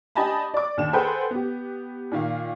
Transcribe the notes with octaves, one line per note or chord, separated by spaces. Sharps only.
D4 G4 D#5 G#5 A5 B5
D5 D6
D#2 D4 E7
G#4 A4 B4 C5 F#5 G5
B3 G4
A#2 D#3 F5